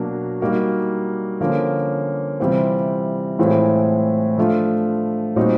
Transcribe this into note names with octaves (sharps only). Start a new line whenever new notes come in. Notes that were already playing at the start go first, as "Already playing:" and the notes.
Already playing: B2 F#3 A#3 D4 F#4
G3 A#3 D#4 F#4
D3 F3 A#3 C#4
C3 E3 G3 C4 F4
A2 E3 G#3 C4 F4
F3 A3 D4 F4
A#2 G3 C4 D#4 F#4